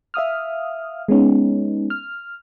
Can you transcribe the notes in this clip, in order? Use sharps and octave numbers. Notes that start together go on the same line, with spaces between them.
E5 F5 D#6 F6
G#3 B3 C#4 D#4
F6